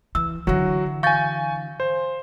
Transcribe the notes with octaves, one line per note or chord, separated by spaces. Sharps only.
E3 E6
D3 E3 F#3 F#4
F5 G#5 C#6 G6 A6
C5